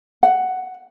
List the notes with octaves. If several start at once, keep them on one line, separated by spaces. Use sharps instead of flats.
F#5